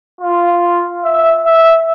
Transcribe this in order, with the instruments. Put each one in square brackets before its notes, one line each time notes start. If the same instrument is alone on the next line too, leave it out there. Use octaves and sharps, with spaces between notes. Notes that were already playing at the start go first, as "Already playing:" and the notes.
[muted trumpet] F4
E5
E5